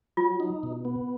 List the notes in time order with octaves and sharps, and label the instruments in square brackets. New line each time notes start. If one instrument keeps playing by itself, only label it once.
[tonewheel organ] F#3 [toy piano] F4
[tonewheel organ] D#4
B2
B3